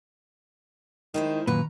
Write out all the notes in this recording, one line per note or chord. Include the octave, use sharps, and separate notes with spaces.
D#3 G#3 E4 C5
F#2 A#2 D#3 B4 A#5